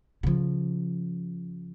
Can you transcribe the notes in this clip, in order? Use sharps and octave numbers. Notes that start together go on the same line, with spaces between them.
C#3 F3